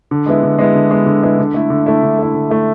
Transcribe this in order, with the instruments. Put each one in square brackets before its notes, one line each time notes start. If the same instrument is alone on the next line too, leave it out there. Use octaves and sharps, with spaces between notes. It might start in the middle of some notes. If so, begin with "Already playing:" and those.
[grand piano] D3
G#3 B3 E4
D3
G#3 B3 E4
D3
G#3 B3 E4
D3
G#3 B3 E4
D3
A3 E4
D3
A3 E4
D3
A3 E4
D3
A3 E4